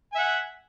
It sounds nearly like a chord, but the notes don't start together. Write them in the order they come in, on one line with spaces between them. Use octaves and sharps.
G#5 E5 F#5